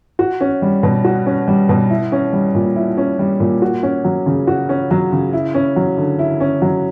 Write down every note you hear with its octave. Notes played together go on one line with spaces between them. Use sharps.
F#4
C#4
G3
B2
F#4
C#4
G3
B2
E4
C#4
G3
A#2
E4
C#4
G3
A#2
F#4
C#4
F#3
C#3
F#4
C#4
F#3
C#3
E4
C#4
F#3
D3
E4
C#4
F#3